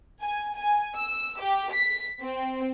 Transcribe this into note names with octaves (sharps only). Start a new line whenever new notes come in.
G#5
G#5
E6
G4
B6
C4